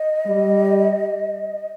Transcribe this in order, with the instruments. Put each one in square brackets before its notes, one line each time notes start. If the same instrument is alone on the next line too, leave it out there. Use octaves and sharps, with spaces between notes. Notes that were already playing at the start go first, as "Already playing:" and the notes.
Already playing: [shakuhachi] D#5
[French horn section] G3